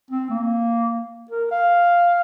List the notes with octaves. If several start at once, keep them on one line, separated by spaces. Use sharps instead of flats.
C4
A#3
A#4
F5